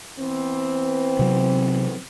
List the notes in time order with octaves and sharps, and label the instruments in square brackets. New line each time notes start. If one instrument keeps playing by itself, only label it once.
[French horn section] E3 B3 C4
[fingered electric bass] C3 F#3